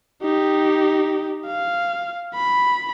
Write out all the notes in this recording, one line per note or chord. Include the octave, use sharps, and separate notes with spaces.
D#4 G4
F5
B5